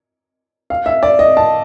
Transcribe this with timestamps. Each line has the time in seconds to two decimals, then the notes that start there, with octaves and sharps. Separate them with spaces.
0.70 F5
0.86 E5
1.03 D5
1.19 D#5
1.37 A5